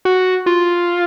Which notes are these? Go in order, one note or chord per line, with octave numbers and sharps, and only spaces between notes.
F#4
F4